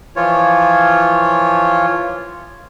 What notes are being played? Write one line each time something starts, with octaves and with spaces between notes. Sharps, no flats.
E3 F3 F4 C#5